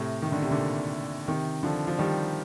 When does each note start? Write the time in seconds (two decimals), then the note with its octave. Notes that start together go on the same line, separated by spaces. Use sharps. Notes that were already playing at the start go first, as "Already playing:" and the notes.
Already playing: A2 C3
0.22 D#3
0.32 D3
0.42 C3
0.51 A#2 D3
1.28 C3 D#3
1.63 D3 F3
1.87 F3
1.98 D#3 G3